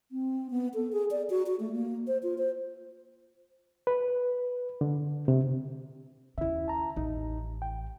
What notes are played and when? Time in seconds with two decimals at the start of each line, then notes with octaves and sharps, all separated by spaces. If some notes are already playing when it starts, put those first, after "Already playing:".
0.11 C4
0.50 B3
0.74 A4
0.92 G#4
1.11 D5
1.30 F#4
1.46 F#4
1.60 A3
1.73 A#3
2.07 C5
2.23 F4
2.38 C5
3.87 B4
4.81 D3
5.28 C3
6.38 D#2 C#3 E4 E5
6.68 A5 A#5
6.96 A1 D#2 D#4
7.62 G5